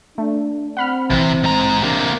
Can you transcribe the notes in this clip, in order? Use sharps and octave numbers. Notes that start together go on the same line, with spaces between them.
A3 D4
C4 F#5 B5 F6
A#1 C3 E3
G#2 A#5
C3 A#3 D4